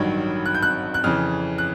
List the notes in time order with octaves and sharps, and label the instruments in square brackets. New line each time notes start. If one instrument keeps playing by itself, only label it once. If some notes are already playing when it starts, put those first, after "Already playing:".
Already playing: [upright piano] A1 G2 D#3 F#3 G#6
F#6
G6
F#6
F#6
F2 C#3 E3 F6
F#6